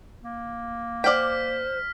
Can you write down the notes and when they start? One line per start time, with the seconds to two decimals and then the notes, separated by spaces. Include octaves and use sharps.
0.23 A#3
1.04 C5 D5 F#5 G5 F6 B6